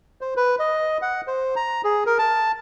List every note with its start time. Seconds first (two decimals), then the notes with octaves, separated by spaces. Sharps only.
0.21 C5
0.37 B4
0.59 D#5
1.02 F#5
1.27 C5
1.56 A#5
1.84 G#4
2.06 A#4
2.19 A5